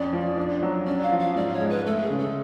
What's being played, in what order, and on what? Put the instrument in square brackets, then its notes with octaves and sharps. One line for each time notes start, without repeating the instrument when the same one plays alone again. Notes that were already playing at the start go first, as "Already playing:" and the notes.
Already playing: [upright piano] F2 C#4 [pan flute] D5
[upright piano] F3
D4
F#3
[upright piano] C#4 [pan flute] D5
[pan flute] F5
[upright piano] F3
[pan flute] F5
[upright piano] G#2 [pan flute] D5
[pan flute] C#5
[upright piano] G#3
[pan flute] B4
[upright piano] A3 [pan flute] A4
[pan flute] G#4
[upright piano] C#3
[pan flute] A4